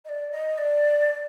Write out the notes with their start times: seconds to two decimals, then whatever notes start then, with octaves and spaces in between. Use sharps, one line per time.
0.05 D#5
0.09 D5
0.31 D#5
0.58 D5
1.11 D5